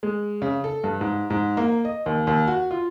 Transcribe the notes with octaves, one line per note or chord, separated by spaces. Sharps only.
G#3
C#3
A4
G2
G#2
G#2
A#3
D#5
D#2
D#2
F#4
F4